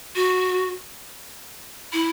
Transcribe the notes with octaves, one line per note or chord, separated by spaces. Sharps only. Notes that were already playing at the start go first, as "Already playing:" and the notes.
F#4
E4